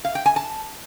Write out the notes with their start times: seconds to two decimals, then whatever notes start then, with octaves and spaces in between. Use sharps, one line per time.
0.05 F5
0.15 G5
0.26 G#5
0.36 A5